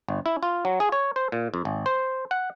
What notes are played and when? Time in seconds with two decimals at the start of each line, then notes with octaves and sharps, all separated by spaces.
0.08 G1
0.26 E4
0.43 F4
0.65 F#3
0.80 G#4
0.92 C#5
1.16 C5
1.32 A#2
1.54 F2
1.65 G#1
1.86 C5
2.31 F#5